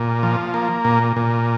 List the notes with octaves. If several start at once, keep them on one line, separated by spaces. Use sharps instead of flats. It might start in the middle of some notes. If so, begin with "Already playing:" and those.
Already playing: A#2
F3
A#3
A#2
A#2